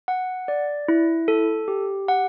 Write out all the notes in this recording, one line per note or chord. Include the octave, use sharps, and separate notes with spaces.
F#5
D5
E4
A4
G4
F#5